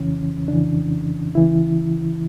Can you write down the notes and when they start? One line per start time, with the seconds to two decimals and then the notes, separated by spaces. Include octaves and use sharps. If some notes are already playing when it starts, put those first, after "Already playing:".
Already playing: F2 C#3 E3 C#4
0.48 F2 C#3 E3 D4
1.35 C#2 C#3 E3 E4